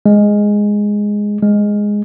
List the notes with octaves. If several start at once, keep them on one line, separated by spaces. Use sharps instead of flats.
G#3
G#3